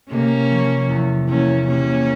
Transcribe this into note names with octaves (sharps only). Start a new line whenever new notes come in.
C3 A#3 C#4
F3
E2
E2 A#3 C#4
C3 A#3 C#4